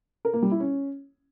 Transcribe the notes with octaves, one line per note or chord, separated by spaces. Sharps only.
A#4
A#3
G3
E4
C#4